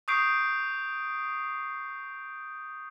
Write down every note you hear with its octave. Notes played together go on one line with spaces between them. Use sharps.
C#6 D#6 G6 C7 D7